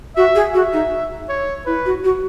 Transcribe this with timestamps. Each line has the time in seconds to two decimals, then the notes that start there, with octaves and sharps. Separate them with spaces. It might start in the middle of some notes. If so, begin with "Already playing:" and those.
0.16 F#4 E5
0.35 G#4
0.53 F#4 E5
0.72 D#4
1.29 C#5
1.66 E4 B4
1.85 F#4
2.04 F#4